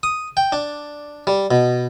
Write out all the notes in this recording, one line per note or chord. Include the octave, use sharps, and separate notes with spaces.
D#6
G5
D4
G3
B2